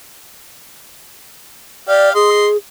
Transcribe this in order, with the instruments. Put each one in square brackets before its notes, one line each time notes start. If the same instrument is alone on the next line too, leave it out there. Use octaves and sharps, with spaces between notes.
[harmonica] G4 F5 [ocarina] D5
[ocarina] G#4 [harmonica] D#5 C6